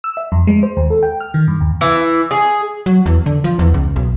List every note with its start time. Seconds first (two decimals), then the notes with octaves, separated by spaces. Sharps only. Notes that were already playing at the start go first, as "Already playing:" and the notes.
0.04 E6
0.17 E5
0.32 F2
0.47 G#3
0.63 C5
0.77 D#2
0.90 A4
1.03 G5
1.20 F6
1.34 D#3
1.48 G2
1.61 D#2
1.81 E3
2.31 G#4
2.86 F#3
3.06 E2
3.26 D3
3.44 F3
3.59 E2
3.74 C#2
3.96 B1